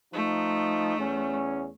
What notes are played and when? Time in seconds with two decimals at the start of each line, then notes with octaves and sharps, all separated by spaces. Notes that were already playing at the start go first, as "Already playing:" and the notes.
0.13 F3 A3 D#4
0.98 E2 C#4